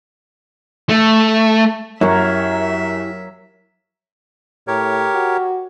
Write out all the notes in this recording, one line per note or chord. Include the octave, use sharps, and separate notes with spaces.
A3
F#2 F#3 E4 G4 A#4 C#5 E5 F#5
A2 G4 A#4 C#5
F#4